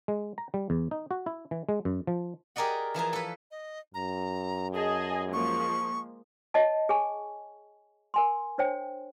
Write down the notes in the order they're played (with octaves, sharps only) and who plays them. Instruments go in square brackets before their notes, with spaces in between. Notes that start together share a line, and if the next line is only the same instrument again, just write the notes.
[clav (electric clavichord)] G#3
A#5
G3
E2
D#4
F#4
E4
E3
G#3
F#2
F3
[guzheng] G4 G#4 A#4 D5 D#5 F#5
E3 F3 G#4 A#4
A4 B4
[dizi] D#5
[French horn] F#2 [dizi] A#5
[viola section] G#4 D#5 G#5 [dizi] A5
[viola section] F3 G#3 A#3 [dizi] C#6
[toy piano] C#5 D#5 A5
G#4 C#5 G#5 C#6
A#4 G#5 C6
D4 C5 C#5 G5